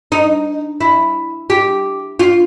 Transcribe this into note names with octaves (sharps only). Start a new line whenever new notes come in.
D#4
E4
G4
F4